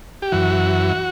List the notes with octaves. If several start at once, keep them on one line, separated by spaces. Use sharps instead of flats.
G4
F#2 E3 F#4